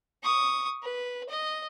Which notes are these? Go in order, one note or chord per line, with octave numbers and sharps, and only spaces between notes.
C#6 D#6
B4
D#5